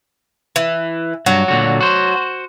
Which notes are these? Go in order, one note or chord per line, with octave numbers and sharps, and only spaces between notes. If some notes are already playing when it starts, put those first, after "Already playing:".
E3
G2 F#3 F#4
A#2 D3 F#4
F#4 C5